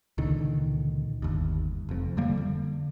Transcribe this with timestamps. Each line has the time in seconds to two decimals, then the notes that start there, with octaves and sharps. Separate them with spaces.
0.18 C#2 A#2 D3 D#3
1.22 G1 D#2
1.89 F1 F2
2.17 F2 D3 G3 A#3
2.37 D3